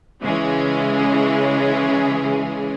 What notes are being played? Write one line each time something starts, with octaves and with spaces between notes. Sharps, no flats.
C#3 E3 G#3 C#4 G#4